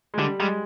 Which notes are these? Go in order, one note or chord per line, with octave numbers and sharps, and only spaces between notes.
G#3
D3 G3
G3 G#3